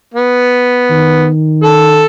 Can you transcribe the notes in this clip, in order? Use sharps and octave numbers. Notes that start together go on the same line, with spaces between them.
B3
D#3
A4